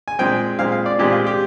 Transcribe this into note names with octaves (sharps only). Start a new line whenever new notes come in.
G#5
A#2 G#3 C4 G5
A#2 G#3 C4 F5
F5
D5
A#2 G#3 C4 G4
F4
G4